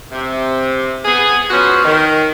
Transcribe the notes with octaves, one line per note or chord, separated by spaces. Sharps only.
C3
B3 G#4
F3 B3 C#4 F#4
D#3